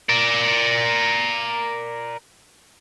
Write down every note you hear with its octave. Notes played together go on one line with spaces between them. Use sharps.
A#4 D5